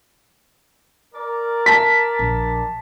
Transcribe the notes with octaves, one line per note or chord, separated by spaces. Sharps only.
A#4 D5
A5 B6
A#1